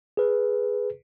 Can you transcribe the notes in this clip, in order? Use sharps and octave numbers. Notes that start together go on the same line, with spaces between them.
G#4 B4